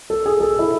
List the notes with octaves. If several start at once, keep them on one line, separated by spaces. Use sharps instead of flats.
A4
G#4
A4
E4